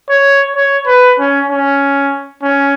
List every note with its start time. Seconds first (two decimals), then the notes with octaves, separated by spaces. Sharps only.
0.10 C#5
0.56 C#5
0.87 B4
1.19 C#4
1.49 C#4
2.43 C#4